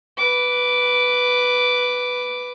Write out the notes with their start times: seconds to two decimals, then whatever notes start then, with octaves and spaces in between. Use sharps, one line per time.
0.17 B4 D6